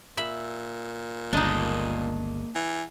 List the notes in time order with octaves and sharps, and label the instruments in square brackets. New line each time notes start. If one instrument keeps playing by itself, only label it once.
[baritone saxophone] A#2 [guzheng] E5 B5
[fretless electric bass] G1 C#2 [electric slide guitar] A#3 G#4 D#5 [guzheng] D4 D#4
[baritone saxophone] E3